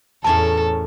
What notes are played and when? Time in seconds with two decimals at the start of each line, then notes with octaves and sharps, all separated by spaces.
0.24 E2 A2 C#4 A4 A#4 A5